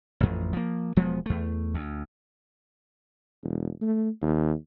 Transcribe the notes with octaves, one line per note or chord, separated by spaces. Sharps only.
A1 F2
F3 A#3
E1 F3 G#3 B3
E2 A3
D2
E1
A3
D#2